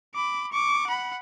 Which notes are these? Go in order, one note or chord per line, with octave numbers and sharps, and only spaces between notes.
B5 D6
C#6 D6
F#5 B5